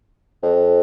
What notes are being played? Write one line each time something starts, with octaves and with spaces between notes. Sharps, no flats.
F2